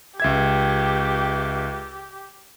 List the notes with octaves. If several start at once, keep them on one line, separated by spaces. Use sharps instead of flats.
C#2 G4 E5 G#6